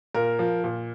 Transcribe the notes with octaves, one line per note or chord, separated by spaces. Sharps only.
A#2 A#4
F3
A#2